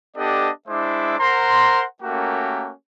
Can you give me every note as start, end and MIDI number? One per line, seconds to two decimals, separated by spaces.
0.16 0.49 59
0.16 0.49 62
0.16 0.49 67
0.16 0.49 69
0.16 0.49 74
0.16 0.49 75
0.68 1.15 56
0.68 1.15 62
0.68 1.15 64
0.68 1.15 72
0.68 1.15 76
0.68 1.15 86
1.18 1.84 70
1.18 1.84 72
1.18 1.84 78
1.18 1.84 82
1.18 1.84 84
2.02 2.72 57
2.02 2.72 58
2.02 2.72 61
2.02 2.72 66
2.02 2.72 67
2.02 2.72 70